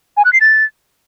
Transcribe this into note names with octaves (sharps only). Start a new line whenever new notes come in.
G#5
F#6
C7
A6